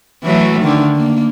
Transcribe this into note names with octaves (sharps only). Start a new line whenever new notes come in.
E3 F#3 A3
D3 D#3
A#3